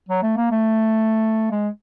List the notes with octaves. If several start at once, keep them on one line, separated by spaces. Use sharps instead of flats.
F#3
A3
A#3
A3
G#3